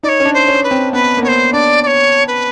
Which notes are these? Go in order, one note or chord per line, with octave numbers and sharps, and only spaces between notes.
D#4 C#5 D5
C#4
D4
C5
C#4
B4
C4
B3 B4
A#3
B3 C#5
C5
D4 D5
D5
C#5
B4